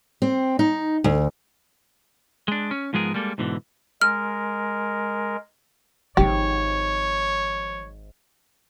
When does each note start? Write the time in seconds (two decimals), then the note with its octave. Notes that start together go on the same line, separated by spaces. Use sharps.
0.22 C4
0.59 D#4
1.04 D2
2.48 G#3 D4
2.71 C#4
2.93 G#2 F3 G#3 B3 G#4 A#4
3.14 G3 G#3 A#3 A4
3.38 G#2 B2 D3 E3
4.01 G#3 A#4 F6
6.17 G#1 F3 D#4 G4 C#5